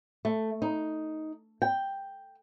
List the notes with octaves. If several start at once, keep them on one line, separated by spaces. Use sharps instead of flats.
A3
D#4
G5